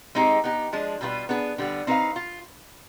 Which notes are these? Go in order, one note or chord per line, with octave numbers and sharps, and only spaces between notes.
G#3 C4 D#4 G4
B3 D#4 G4
F3 G#3 D4
B2 G3 D4 F4 B4
B3 D4 G#4 B4
D3 G3 B3
C4 D#4 B4 F5
F4